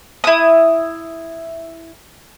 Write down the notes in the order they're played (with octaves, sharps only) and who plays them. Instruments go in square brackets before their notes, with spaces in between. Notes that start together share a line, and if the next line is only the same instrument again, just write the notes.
[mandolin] E4 D#6